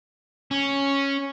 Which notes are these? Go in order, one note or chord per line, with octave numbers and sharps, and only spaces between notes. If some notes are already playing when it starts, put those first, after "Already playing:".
C#4